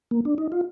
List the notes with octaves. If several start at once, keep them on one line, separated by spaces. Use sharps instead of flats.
A#3
D4
D#4
F4